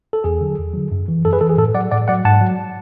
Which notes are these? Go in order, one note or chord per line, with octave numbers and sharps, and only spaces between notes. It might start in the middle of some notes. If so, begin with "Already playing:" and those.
A4
E2 G#4
D3 F#3
E2
D3 F#3
F#2
E3
F#2 A4
G#4 B4
E3 A4
G#4
A2 A4
F#3 D5 F#5
A2 D5 F#5
F#3 D5 F#5
G#2 F#5 A5
F#3